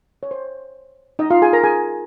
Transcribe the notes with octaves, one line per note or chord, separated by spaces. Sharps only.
C#5
C5
D#4 D#5
F4 F5
G#4 G#5
A#4 A#5
G#4 G#5